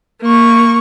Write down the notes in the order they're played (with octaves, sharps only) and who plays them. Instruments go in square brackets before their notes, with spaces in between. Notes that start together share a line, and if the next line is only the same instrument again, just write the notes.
[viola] A#3 C#6